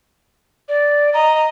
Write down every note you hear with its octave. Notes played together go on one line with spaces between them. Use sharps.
D5
D#5 A#5